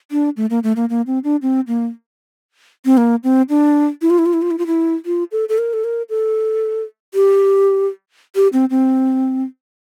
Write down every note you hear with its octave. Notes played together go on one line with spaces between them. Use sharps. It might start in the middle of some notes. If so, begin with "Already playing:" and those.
D4
A3
A#3
A3
A#3
A#3
C4
D4
C4
A#3
C4
A#3
C4
D4
E4
F4
E4
F4
E4
F4
E4
F4
E4
F4
A4
A4
A#4
A4
A#4
A4
G4
G4
C4
C4